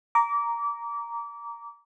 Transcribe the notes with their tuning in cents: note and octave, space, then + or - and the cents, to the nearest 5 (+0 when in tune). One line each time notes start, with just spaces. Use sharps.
A#5 +0 D6 -25